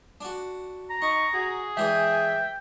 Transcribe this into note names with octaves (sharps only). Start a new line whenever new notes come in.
D4 F#4
A#5
D#4 D#5 C#6
F#4 G#4
E3 G#3 D4 E5 G5